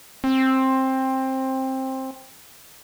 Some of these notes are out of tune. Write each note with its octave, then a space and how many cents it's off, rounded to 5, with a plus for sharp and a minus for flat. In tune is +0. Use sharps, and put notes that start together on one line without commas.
C4 +15